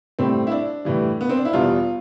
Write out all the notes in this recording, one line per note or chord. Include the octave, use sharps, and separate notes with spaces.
A2 G3 C4
E4
D4
A2 E3 G3
B3
C4
D4
E4
E2 B2 G3 F4